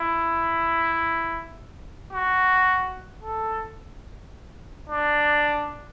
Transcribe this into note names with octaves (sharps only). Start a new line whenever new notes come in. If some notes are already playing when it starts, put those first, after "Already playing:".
Already playing: E4
F#4
A4
D4